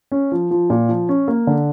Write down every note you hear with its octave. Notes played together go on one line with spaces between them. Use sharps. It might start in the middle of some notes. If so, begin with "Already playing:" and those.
C#4
F3
F3
A#2
F3
C#4
A#3
D3